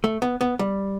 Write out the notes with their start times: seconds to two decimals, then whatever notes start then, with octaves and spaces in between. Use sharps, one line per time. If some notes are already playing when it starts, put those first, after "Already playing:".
0.04 A3
0.22 B3
0.41 B3
0.59 G3